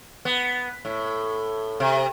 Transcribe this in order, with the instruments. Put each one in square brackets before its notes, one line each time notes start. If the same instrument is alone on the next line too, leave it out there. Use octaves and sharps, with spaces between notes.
[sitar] B3
A2
C3